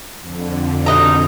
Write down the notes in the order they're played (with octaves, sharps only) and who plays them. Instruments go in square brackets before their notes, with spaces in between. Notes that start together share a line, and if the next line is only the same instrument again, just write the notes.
[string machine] F2 D3
[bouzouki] B2 D#4 A#5